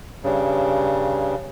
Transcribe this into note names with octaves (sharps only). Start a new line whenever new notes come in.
G2 C#3